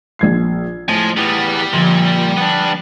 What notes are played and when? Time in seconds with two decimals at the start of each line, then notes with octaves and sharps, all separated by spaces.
0.19 A#1 G#6 C7
0.89 A2 F3 D#5 G#5
1.17 E2 G3 B3
1.73 A#2 D3 F3 C6
2.37 B3 D4